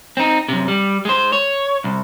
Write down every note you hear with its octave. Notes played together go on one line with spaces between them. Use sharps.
C4 D#4
F#2 C3
G3
G#3 C5
C#5
C2